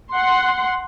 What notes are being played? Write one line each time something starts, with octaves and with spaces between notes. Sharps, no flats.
F#5 C6